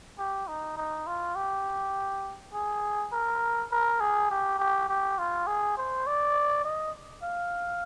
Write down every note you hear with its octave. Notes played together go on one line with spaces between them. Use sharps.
G4
D#4
D#4
F4
G4
G#4
A#4
A#4
G#4
G4
G4
G4
F4
G#4
C5
D5
D#5
F5